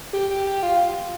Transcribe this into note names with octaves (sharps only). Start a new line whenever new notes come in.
G4
G4
G4
F4